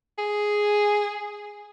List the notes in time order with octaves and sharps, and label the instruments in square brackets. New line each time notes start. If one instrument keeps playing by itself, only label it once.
[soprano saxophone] G#4